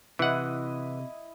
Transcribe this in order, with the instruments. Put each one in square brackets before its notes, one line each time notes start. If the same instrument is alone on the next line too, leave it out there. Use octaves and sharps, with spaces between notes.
[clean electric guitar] C3 [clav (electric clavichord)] E3 F#5 [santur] E4 D#5